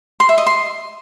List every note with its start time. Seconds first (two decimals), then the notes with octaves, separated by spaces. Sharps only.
0.20 C6
0.29 E5
0.38 D#5
0.46 C6